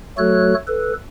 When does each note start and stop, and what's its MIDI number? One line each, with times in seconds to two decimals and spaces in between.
0.18 0.54 54
0.18 0.54 57
0.18 0.54 66
0.18 0.54 69
0.18 0.54 73
0.18 0.54 90
0.67 0.93 69
0.67 0.93 71